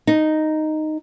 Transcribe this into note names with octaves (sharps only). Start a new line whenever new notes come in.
D#4